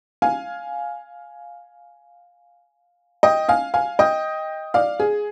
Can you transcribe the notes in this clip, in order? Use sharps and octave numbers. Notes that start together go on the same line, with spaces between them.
F5 G#5
D#5 G5
F5 G#5
F5 G#5
D#5 G5
D5 F5
G#4